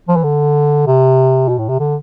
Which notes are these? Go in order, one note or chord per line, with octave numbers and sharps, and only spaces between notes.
F3
E3
D3
C3
B2
A2
C3
D3